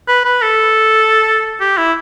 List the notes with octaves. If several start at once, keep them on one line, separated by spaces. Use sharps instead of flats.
B4
B4
A4
G4
E4